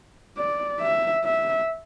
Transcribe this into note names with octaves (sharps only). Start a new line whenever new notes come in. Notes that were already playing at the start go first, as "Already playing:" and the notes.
D5
E5
E5